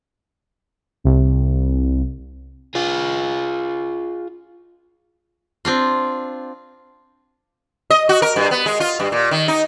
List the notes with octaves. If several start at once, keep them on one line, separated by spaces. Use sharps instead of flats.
C2
F4 G#4
C4 D4 F4
D#5
F#4
A#4
G2
B3
G#3
F4
G2
A#2
D#3
D#4